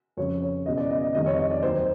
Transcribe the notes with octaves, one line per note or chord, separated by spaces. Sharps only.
F2 C#3 F3 C#5
C#5
E1 E2 C#3 D#5
D5
D#5
D#5
F1 F2 C3 D#3 G3 D#5
C#5
D#5
D5
D#2 D#3 F#3 C5